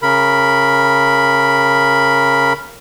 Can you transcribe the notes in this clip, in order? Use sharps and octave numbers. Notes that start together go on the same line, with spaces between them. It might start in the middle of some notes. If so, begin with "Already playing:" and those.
C#3 A#4 B5